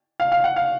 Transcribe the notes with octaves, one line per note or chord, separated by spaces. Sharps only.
F5
F5
F#5
F5